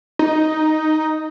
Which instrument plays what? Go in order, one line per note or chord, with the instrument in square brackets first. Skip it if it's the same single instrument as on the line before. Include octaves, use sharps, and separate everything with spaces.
[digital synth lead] D#4